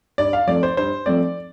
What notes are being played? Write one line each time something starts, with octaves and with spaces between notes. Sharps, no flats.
G2 D5
F5
F3 A3 C4 D5
C5
G2 C5
F3 A3 C4 D5